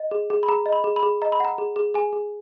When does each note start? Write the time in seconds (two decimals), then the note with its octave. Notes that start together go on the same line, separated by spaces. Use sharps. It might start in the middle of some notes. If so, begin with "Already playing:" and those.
Already playing: D#5
0.11 G#4
0.30 G#4
0.43 B5
0.48 G#4 A#5
0.66 D#5
0.72 B5
0.84 G#4
0.96 B5
1.03 G#4
1.22 D#5 A#5
1.32 B5
1.40 F#5 A#5
1.58 G#4
1.76 G#4
1.94 G#4 G#5
2.13 G#4